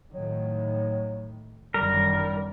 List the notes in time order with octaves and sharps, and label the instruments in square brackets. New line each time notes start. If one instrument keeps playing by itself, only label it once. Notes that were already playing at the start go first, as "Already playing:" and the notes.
[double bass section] A2 D#3 [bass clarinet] F#3
[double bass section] G1 F#2 D#3 [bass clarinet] G3 [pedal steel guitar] A#4